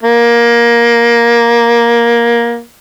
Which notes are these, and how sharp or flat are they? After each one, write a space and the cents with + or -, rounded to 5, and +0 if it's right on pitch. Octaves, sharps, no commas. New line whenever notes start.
A#3 +15